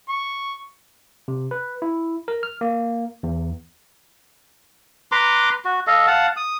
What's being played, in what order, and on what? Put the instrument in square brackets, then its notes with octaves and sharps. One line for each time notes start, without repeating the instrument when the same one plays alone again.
[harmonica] C#6
[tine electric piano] C3
B4
E4
A#4
F6
A#3
E2
[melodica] B4 A#5 C6 D6
F#4
A4 D#5 F5
F5 F#5 A5
D#6